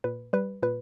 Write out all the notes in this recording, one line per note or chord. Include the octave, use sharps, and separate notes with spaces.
A#2 B4
G3 B4
A#2 B4